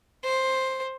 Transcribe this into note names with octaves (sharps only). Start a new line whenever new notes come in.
C5